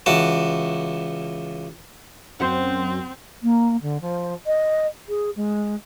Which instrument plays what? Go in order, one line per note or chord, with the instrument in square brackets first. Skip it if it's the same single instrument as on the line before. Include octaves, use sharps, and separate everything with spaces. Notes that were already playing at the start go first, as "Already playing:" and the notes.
[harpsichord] C#2 E3 F#4 A5
[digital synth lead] F#2 [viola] C4 [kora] C5 F#5
[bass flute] A#3
D3
F3
D#5
G#4
G#3